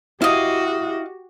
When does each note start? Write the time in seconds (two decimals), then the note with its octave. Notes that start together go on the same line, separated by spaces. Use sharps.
0.22 E4 F#4 G4 D#5 F5